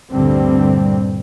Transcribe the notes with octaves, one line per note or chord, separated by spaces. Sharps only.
D2 G2 A#2 D3 G3 C4